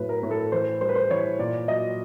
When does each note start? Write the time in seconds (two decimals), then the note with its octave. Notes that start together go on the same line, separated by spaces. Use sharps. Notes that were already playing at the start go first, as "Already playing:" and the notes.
Already playing: A2 F#3 B4
0.09 A#4
0.23 A2
0.31 A4
0.52 E3 C5
0.81 G3 C5
0.89 B4
0.96 C5
1.10 E3 C#5
1.39 A#2 D5
1.68 F#3 D#5